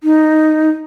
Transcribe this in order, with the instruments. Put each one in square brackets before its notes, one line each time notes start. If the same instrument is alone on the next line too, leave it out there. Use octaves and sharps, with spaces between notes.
[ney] D#4